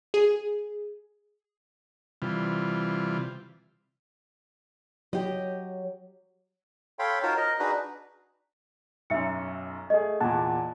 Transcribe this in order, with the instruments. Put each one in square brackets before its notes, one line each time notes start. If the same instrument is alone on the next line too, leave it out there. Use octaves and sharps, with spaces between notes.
[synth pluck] G#4
[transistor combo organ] C3 E3 G3 F4
[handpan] F#3 [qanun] G4 D#5
[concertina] A4 C#5 F5 G5 B5 C6
D#4 F4 F#4 A#4 C5 C#5
A#4 D#5
D4 D#4 F#4 G#4 B4
[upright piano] B1 F#2 [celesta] E5 C#7
[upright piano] A3 G#4 [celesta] D#5
[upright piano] E2 A#2 [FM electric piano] F#5 A5